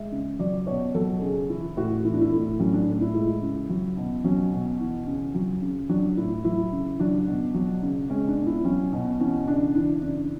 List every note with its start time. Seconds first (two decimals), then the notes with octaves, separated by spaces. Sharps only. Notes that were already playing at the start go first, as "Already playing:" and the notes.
Already playing: G#3 E5
0.12 C#3
0.39 F#3 D5
0.67 B2 C#5
0.94 F#3 A4
1.21 C#3 G#4
1.49 E3 E4
1.77 A2 F#4
2.04 E3 E4
2.13 D4
2.21 E4
2.32 A2 E4
2.59 F#3 C#4
2.73 D4
2.87 A2
3.01 E4
3.14 G#3 E4
3.42 C#3
3.69 F#3
3.97 B2
4.24 F#3 C#4
4.52 B2
4.80 E3
5.07 C#3
5.35 F#3
5.62 C#3
5.89 F#3 D4
6.17 A2 E4
6.44 F#3 E4
6.72 C#3
7.00 F#3 D4
7.27 B2
7.54 F#3
7.83 C#3
8.10 G#3 C#4
8.28 D4
8.37 B2
8.46 E4
8.64 F#3 C#4
8.92 B2
9.20 E3 C#4
9.47 C#3 D4
9.75 E3 D4
10.02 C#3 D4